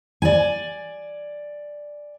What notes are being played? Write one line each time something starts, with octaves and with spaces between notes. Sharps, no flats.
D5 G#5